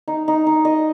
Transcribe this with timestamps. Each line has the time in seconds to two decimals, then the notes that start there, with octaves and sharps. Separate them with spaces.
0.08 D#4
0.28 D#4
0.46 D#4
0.65 D#5